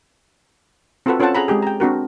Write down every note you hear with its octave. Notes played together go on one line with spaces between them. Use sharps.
C4 F4 F#4 A4 B4 F#5
C#4 F4 A4 C5 F#5 A5
G#4 F#5 A#5 B5
G#3 C4 G4 G#4
G5 A#5
C4 D4 F#4 A#4